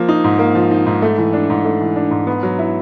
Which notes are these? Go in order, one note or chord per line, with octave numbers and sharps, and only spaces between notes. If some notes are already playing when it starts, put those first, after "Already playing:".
Already playing: F3 A#3
D#4
G#2
A#3
F3
D#4
G#2
A3
E3
D4
G#2
A3
E3
D4
G#2
B3
F#3
E4